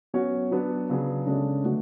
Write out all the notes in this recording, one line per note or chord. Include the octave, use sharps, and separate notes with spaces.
F#3 B3 C#4 F#4 C#5
F#3 B3 D4
C#3 F#3 B3 D4 G#4
C#3 G#3 C#4 D4 A4 C#5
D3 F#3 A3 B3 F#4